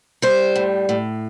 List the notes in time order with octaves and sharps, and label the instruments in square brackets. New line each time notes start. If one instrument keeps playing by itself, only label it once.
[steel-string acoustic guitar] G3 C5
A2
A2